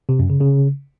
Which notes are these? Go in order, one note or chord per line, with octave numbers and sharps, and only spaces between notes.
C3
F#2
C#3
C#3